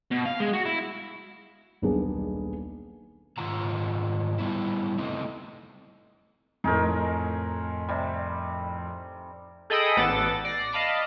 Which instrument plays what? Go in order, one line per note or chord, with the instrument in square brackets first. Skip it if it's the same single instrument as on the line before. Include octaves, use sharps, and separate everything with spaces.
[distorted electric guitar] B2
F5
G#3
F#4
E4
[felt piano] D#1 B1 A#3 B3 D4 G#4
[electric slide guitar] G#2 D#3 F4 F#5 A#5
G3 B3 E4
A3 C4 D#4
[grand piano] F2 A2 [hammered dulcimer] D#4 G#4 A#4
[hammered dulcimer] C3 G3
[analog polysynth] G#4 A4 D#5 G5 B5 D#6
A1 B3 A4 F#5 D6 A6
D5 A#6 C7
D#5 F5 A5 B5 D6